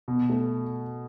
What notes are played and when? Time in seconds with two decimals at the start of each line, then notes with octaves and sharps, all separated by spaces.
0.08 B2
0.30 A3